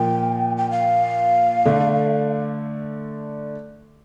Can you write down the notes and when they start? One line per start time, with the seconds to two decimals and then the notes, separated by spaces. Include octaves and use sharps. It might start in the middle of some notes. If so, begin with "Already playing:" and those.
Already playing: A#2 F3 A#3 G5
0.57 G5
0.71 F5
1.65 D3 A3 D4